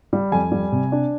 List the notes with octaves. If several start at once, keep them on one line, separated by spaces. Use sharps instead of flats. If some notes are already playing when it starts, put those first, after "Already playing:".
G3
F2 G#5
G3
C3
D4